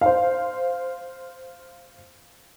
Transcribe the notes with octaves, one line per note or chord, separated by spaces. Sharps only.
C5 F5